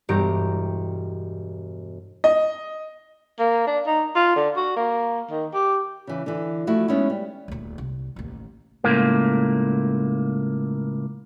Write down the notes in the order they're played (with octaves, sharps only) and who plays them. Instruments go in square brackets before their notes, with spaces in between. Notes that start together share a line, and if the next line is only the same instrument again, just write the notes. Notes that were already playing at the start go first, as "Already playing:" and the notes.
[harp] E1 G2 G4 A#5 D7
[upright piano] D#5
[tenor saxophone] A#3
D4
D#4
F4
D3
F#4
A#3
D#3
G4
[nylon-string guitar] C#3 E3
D3 E3
F3 A3 E4 F#4
G#3 B3 C#4 D#4 E4
G3
[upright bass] D#1 D2
C2
A1 D#2
[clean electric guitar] C#2 A2 A#3